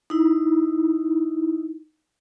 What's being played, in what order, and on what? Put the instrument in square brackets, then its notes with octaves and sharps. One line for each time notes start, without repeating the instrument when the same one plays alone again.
[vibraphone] D#4 E4